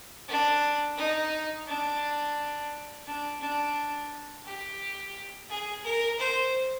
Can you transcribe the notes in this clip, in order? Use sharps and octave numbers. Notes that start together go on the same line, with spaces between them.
D4
D#4
D4
D4
D4
G4
G#4
A#4
C5